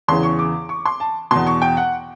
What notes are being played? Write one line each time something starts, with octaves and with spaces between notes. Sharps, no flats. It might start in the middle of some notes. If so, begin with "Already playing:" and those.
E2 C#3 E3 C6
C#6
D6
C#6
C6
A5
E2 B2 C6
C#6
G5
F#5